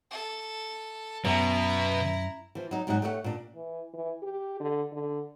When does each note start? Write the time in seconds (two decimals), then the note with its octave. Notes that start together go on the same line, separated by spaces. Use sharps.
0.10 A4
1.25 F#2 B2 E4 A#5
2.55 E3 F3
2.71 F#3 D#4
2.87 G#2 F#3 G3 D#4 F#5
3.02 A3 G4 C#5 D#5 F#5
3.24 A#2 D4
3.55 E3
3.94 E3
4.22 G4
4.60 D3
4.92 D3